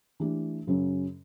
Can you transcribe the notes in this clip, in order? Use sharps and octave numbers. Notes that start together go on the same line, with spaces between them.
E3 A3 D4 G4
F#2 C#3 F#3 C#4